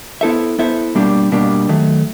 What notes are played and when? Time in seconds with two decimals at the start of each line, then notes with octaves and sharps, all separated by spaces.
0.21 B3 E4 A4 C5 E5
0.59 B3 E4 A4 C5 E5
0.95 B2 G3 A#3 D4 G4
1.32 B2 G3 A#3 D4 G4
1.69 D#3 F#3 A3